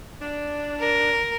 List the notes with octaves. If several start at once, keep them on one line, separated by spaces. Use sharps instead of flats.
D4
A#4